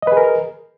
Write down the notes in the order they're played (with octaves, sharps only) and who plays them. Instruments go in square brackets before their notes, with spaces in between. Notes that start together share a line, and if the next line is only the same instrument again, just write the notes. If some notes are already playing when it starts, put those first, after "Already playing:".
[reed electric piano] D#5
B4
G#4
A#4